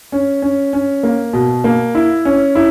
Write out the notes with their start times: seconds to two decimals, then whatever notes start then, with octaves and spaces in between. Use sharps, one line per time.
0.12 C#4
0.42 C#4
0.73 C#4
1.03 A#3
1.33 B2
1.64 A#3
1.95 E4
2.25 C#4
2.55 E4